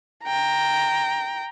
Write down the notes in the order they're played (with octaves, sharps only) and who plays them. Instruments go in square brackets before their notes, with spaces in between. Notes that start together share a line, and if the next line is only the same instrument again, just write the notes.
[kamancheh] G5 A#5